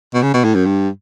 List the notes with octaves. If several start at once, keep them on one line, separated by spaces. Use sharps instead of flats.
B2
C#3
B2
A2
F#2
G2